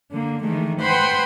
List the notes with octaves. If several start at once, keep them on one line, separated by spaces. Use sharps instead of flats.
D3 A#3
D#3 E3 G#3 A3
B4 C5 F#5 G5 B5 C6